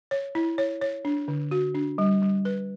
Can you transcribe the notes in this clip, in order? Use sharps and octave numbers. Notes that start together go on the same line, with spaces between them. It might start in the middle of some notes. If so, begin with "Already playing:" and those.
C#5
E4
C#5
C#5
D4
D3
F#4
D4
G3
G3
B4